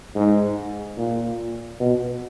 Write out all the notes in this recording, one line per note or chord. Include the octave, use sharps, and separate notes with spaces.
G#2
A#2
B2